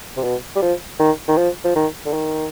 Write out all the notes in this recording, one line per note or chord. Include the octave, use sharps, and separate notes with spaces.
C3
B2
G3
F3
D#3
D#3
F3
F3
D#3
D3
D#3